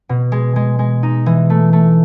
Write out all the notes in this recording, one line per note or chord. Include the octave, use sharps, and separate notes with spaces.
B2
G#3
G#3
G#3
D#4
E3
A3
A3